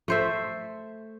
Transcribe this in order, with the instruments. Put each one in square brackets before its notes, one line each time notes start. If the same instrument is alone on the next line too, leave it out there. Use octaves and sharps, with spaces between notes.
[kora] A3 C5 E5